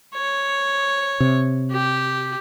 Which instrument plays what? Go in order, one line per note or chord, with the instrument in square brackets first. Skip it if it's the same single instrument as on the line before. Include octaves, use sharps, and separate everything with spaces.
[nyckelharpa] C#5
[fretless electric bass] C3
[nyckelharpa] G4